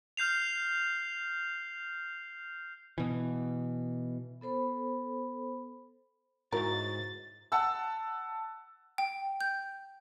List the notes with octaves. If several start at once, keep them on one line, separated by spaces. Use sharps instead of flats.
F6 G6 C7 F7
B2 E3
B3 A4 C5 B5
G#2 E4 F#4 A#4 C#5 A6
F#5 A5 E6
G5
G6